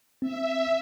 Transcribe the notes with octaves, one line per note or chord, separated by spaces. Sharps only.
C4 E5